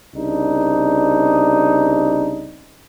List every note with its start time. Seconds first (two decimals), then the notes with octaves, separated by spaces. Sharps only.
0.16 C2 C#3 D4 D#4